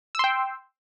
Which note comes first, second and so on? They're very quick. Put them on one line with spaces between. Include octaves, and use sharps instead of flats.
E6 C6 G5